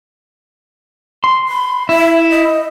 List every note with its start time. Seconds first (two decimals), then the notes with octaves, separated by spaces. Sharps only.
1.24 C6
1.48 B5
1.89 E4 E5
2.30 D#5